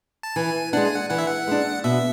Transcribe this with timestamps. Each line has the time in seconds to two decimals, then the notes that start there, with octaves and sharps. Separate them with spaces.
0.23 A5
0.36 E3 G#5
0.73 G#3 D4 F#5
0.85 G#5
0.95 F#5
1.10 E3 F#5
1.18 E5
1.27 F#5
1.48 G#3 D4
1.84 B2 E5